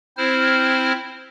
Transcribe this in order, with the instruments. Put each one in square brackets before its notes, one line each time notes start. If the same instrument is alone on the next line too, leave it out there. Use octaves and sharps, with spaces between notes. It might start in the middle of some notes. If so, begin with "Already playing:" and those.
[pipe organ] C4 E4 C5 F6